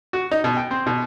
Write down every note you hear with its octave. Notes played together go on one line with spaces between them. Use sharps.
F#4
D#4
B2
G5
C4
B2